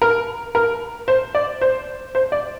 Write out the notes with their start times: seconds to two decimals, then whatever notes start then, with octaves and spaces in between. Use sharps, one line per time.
0.02 A#4
0.55 A#4
1.08 C5
1.35 D5
1.61 C5
2.15 C5
2.32 D5